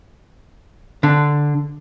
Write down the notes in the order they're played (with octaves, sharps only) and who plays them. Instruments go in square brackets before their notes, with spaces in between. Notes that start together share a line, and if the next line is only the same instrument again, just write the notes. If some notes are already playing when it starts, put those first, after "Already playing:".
[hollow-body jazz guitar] D3